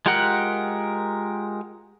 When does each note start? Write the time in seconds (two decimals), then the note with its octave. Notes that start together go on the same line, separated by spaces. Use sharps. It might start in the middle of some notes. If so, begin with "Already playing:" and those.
0.06 G#3 F4 G4 A#4 F#5